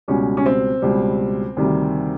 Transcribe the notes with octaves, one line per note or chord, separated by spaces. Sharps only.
C#2 B2 G3 C#4
C#4
C4
C#2 B2 G3
D2 C3 D#3 G3